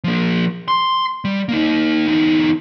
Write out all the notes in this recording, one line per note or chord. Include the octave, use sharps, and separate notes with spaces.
F3 A#3
C6
G3
A#3 D#4
E2 D#4